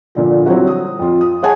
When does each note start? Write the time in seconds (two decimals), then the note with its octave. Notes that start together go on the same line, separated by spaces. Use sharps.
0.15 A#2 D3 F3
0.46 F#3 G3 C4 E4 F#4
0.68 D#6
0.99 F2 F4
1.21 D#6
1.42 G#4 C#5 D#5 F#5 G#5 A5